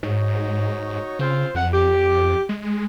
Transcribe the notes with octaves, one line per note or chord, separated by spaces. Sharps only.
G#2 D#4 F#4 C#5
C#3 C4 F4 C5
F2 F#5
G4
G#3